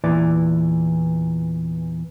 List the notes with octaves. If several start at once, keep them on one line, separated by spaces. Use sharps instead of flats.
E2 A#2 E3 D5